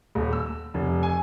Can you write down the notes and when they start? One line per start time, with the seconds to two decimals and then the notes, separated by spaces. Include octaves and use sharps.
0.15 D#1
0.33 E6
0.74 F1
1.03 G#5